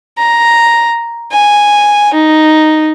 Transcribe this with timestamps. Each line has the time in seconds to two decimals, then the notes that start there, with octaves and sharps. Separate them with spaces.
0.18 A#5
1.31 G#5
2.14 D#4